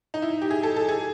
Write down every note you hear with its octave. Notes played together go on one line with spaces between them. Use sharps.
D#4
E4
G4
G#4
A4
A4
G#4